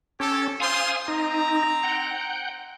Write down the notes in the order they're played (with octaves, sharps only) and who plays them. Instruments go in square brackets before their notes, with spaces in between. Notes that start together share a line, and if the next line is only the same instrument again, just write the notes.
[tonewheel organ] C#4 [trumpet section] G4 A4
[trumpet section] F4 C5 C6 [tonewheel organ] F5 G#5 D#6
[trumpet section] C4 A#5 [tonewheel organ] D#4
[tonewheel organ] F#5 G5